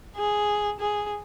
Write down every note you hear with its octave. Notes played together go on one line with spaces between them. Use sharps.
G#4
G#4